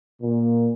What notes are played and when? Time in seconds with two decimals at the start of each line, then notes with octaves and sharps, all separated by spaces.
0.22 A#2